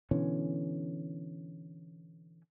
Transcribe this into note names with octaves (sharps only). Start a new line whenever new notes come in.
B2 D3 E3 C#4